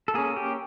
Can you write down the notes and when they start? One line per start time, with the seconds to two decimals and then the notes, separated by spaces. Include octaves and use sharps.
0.08 A4
0.14 A#3 C#4 G#4
0.37 G4